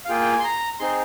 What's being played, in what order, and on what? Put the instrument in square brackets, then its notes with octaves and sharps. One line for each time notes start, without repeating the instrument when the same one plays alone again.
[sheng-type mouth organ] F5
A#3 F4 G#4 G5
G5
G#5
C6
A#5
C4 D#4 G#4 C6